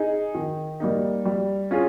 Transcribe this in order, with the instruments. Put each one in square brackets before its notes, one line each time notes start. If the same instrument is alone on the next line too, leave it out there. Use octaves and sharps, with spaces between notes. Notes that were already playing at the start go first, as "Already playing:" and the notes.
Already playing: [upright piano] D#4 G#4
D#3
G3 A#3 D#4
G3
C#4 F4 G#4